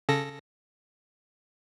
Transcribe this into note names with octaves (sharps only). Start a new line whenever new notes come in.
C#3 A4 A#6